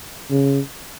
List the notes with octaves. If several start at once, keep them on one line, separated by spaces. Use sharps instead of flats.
C#3